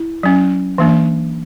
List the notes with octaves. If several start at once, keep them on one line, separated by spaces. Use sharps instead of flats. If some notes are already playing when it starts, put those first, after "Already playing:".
Already playing: E4
F#3 C#4
E3 A#3 D4